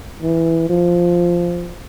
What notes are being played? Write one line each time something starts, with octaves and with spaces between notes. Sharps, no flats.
E3
F3